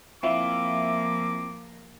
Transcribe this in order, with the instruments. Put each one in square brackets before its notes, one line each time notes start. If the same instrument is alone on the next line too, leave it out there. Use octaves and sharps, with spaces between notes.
[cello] F3 A#3 [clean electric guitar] C4 F4 [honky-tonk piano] E4 [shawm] D6